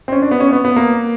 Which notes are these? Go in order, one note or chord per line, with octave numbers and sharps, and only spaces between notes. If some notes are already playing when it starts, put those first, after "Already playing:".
C4
C#4
D4
B3
C#4
B3
B3
A#3